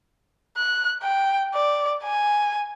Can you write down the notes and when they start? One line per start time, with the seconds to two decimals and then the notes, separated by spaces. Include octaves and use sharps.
0.57 F#6
1.02 G5
1.54 D5
2.03 G#5